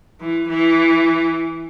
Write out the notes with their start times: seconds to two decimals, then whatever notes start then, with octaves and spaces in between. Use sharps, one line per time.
0.20 E3
0.48 E3